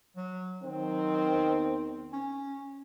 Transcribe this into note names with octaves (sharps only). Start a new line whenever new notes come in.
F#3
D#3 F#3 C4
E2
C#4